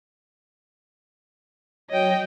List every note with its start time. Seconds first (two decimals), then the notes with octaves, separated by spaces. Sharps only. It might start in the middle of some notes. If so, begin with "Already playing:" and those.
1.90 F#3 C#5 D#5 G5